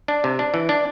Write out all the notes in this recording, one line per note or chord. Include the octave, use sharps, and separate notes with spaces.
D4
C3
D4
E3
D4